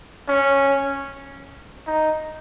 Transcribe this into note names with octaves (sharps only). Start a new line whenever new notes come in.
C#4
D#4